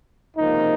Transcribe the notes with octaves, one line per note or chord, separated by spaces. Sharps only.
C#2 C3 F3 A#3 D#4